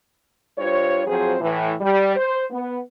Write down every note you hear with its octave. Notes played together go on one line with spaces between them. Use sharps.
G2 F4 C5 C#5
F2 F3 F#3 C4 G#4 C5
A2 E3
G3
C5
B3